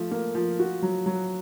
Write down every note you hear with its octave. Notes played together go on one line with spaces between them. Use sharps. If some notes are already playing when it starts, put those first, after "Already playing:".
Already playing: F3 A3
A#3
F3
F#4
F#3
F#3